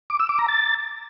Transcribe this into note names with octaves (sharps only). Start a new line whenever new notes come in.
D6
E6
D6
A#5
A6